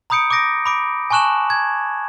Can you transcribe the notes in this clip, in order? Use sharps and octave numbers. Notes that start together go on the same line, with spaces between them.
A#5 B5 D#6 G6 C#7 D7
D6 D#6 G6 A#6 D7
B5 D6 D7
G#5 A5 C#6 F#6 E7 F#7
G#6